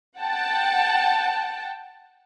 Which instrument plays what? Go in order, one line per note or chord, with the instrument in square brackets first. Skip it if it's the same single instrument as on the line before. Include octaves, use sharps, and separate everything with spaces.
[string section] F#5 G5 A5